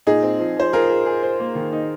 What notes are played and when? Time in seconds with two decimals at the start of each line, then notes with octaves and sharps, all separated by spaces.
0.07 A#2 D#4 G#4
0.23 C4
0.39 F3
0.57 F3 C5
0.73 F4 G#4 A#4
0.89 G#4
1.06 G#4
1.23 C5
1.40 A#3
1.55 D#3
1.73 D#4